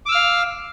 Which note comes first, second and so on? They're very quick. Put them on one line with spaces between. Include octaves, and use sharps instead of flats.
D6 E6 F6 F5